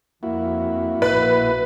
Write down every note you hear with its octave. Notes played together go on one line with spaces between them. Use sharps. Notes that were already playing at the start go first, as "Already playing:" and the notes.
F2 A#3 E4 F#4
A#1 A2 B4